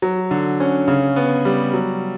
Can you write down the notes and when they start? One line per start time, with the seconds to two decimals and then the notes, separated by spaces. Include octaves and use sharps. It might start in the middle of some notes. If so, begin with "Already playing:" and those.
0.02 F#3
0.31 D3
0.60 C#4
0.88 C#3
1.16 B3
1.45 G3
1.73 F#3